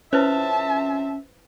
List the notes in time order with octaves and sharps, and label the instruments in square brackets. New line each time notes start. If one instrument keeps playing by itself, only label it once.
[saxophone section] F2 C4 E5 [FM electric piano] C#4 [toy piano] E4 B4 C5 [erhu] A5